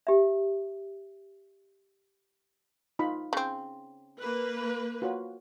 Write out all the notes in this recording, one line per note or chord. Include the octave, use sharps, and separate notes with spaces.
G4 E5
D#4 F4 B5
C#3 C4
A#3 B4
F4 F#4 C#5